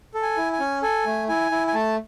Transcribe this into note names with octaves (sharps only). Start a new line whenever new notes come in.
A4
G#5
E4
G#5
C#4
A4 G#5
A3
E4 G#5
E4
G#5
A3 A5